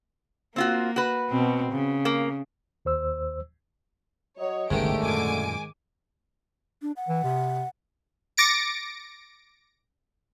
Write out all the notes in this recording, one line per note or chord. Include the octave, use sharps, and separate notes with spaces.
A#3 C4 F4 F#4
F#4 B4
B2 C4
C#3
A#3
D#2 C5 E6
F#3 C#5 D#5
G1 C#2 G#2 D3 D#3 A3 G4 D7
F#2 A#2 G#5 D6 D7
D4
F#5
E3
C3
D6 A6 A#6 C#7 D7